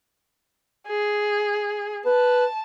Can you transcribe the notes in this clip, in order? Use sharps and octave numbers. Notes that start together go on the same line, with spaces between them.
G#4
B4 A5